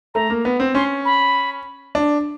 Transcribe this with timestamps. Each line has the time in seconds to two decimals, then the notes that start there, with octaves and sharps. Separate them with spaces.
0.15 A3 A#5
0.30 A#3
0.45 B3
0.60 C4
0.75 C#4 C6
1.05 B5
1.95 D4